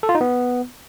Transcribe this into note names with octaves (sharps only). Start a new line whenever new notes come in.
A4
F4
D#4
B3